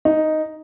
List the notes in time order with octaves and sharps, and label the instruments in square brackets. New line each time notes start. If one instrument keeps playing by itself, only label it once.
[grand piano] D#4